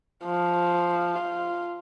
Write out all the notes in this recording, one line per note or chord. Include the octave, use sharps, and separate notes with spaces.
F3
F4